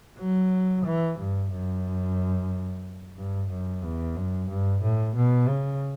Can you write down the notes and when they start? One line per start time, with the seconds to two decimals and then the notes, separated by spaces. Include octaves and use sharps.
0.19 F#3
0.85 E3
1.19 G2
1.52 F#2
3.17 G2
3.50 F#2
3.83 E2
4.16 F#2
4.49 G2
4.82 A2
5.16 B2
5.48 C#3